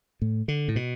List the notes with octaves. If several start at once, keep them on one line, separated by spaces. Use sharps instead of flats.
A2
D3
A2
B2